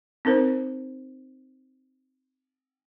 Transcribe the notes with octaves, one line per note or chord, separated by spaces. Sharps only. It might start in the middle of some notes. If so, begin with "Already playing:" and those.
C4 D#4 A#4 C5